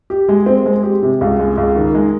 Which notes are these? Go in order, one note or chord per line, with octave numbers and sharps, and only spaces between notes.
G4
G#3
C4
G#3
G4
C3
C#2
G#3
C#2
D#3
G#3